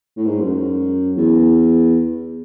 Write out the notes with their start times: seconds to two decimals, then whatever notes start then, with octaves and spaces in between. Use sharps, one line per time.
0.16 A2
0.26 G#2
0.40 F#2
1.17 E2